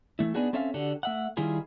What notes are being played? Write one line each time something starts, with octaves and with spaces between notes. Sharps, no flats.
E3 A3 E4
B3 D4 D#4 F#4 G#4
C4 C#4 A4 E5 F5
D3 D4 F#4 G4 A4
A3 E5 F#5
D#3 G3 E4 F4 G#4